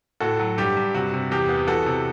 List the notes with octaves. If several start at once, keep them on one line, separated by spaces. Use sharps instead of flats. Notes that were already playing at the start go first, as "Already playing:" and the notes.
A2 F#4 A4
F#3
G2 G4
G2
C3 F#4
C3
E2 G4
B3
E3 F#4 A4
C3